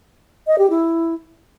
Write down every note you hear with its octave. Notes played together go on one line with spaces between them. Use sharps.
D#5
G4
E4